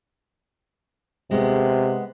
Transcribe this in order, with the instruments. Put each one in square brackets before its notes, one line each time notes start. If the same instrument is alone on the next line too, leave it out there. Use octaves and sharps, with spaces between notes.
[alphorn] C3 [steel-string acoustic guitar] G#3 B3